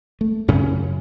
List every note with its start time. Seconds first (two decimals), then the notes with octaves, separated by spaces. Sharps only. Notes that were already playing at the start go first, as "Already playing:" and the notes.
0.21 A3
0.48 F#2 C#3 C#4